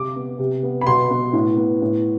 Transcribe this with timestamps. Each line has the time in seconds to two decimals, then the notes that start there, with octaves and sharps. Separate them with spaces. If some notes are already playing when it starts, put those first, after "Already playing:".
Already playing: C3 D6
0.16 B3
0.39 C3
0.63 B3
0.81 B5
0.87 B2 C6
1.10 B3
1.33 A2
1.57 B3
1.82 A2